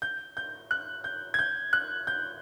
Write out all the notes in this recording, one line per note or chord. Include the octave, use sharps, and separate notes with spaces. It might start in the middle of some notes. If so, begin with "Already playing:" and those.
G6
G6
F#6
G6
G#6
G6
F#6
G6